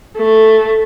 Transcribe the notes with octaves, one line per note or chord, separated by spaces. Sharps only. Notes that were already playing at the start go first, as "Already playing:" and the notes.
A3